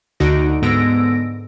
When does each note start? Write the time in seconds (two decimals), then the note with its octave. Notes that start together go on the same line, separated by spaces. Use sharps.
0.20 D2 D3 D#4 F#4 A#6 D7
0.62 G#2 D3 B3 E6 A#6 D7